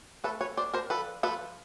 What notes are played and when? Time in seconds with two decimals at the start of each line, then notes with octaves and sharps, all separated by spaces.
0.24 A3 A4 B4
0.41 B4 C#5
0.57 D4 C5 D5
0.74 A#4 C5
0.90 F3 A4 B4
1.23 F3 A4 B4